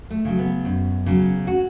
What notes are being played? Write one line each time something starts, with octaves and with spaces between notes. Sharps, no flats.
A3
C#3 F#3
B3
F#2
C#3 F#3
F#4